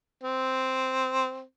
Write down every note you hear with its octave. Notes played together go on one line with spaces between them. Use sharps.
C4